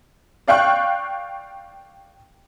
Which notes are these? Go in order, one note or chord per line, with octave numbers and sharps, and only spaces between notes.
D5 F5 G5 C#6 F#6